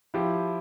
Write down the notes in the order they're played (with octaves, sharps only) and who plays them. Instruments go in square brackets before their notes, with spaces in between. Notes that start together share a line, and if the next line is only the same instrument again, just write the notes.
[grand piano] F3 E4 G4